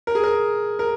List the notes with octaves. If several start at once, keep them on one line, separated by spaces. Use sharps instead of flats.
A#4
G#4
A#4
A#4